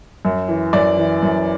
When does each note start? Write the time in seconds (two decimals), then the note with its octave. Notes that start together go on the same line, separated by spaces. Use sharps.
0.25 F#2
0.48 E3
0.73 F#2 D5
0.97 E3
1.23 F#2